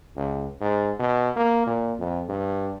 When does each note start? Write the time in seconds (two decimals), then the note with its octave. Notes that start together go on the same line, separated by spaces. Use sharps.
0.16 C#2
0.61 G#2
0.99 B2
1.36 A#3
1.66 A#2
1.99 F2
2.28 G2